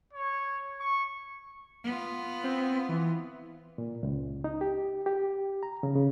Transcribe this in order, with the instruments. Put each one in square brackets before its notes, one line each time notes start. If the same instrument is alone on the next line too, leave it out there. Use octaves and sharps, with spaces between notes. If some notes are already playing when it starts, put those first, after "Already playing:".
[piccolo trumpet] C#5
C#6
[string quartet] B3 F4
[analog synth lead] C4
E3
[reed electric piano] A#2
C#2
D#4
G4
G4
A#5
C#3
C#3